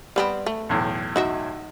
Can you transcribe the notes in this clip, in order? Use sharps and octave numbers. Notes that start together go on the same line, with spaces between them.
G3 B3 C4
A3
B1 E2 A2
D#4 F#4 E5